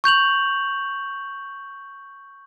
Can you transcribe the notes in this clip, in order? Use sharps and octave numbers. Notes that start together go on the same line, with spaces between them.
C#6 G6 F7 F#7